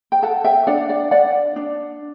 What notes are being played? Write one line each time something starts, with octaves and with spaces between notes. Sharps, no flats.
G5
A4 F#5 A5
E5 G5
D4 D5 F#5
D5 F#5
D4 D5 F#5
D4